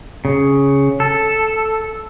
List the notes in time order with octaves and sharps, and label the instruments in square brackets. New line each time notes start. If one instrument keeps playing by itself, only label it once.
[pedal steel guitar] C#3
A4